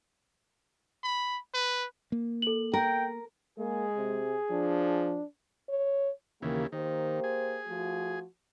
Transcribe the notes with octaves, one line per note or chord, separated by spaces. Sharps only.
B5
B4
A#3
A4 F#7
A#4 G5
G#3 A#3 G#4
C3
F3 D4
C#5
D#2 C#3 E3 A#3 G4
D#3 A#3 G4 C5
G#4
F3 A3 F#4